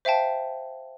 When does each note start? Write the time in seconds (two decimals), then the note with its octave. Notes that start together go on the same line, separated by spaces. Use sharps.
0.05 C5 E5 F5 G5 A5